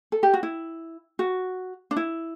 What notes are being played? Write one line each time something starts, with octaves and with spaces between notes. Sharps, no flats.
A4
G4
F#4
E4
F#4
D4
E4